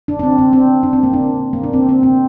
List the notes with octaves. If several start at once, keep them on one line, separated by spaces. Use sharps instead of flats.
D4
D4
C4
C4
C4
D4
C4
A#3
D4
A#3
D4
C4
C4
C4